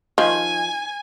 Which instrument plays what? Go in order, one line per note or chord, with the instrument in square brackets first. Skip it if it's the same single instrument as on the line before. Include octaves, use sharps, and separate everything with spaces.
[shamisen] D#3 F3 [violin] G#5